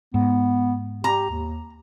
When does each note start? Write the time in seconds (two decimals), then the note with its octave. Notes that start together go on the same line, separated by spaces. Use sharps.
0.14 G#2 B3
1.04 G4 A#5
1.30 D#2